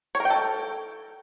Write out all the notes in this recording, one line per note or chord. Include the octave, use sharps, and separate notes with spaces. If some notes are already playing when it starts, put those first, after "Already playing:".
C#5
A#4
G5
A4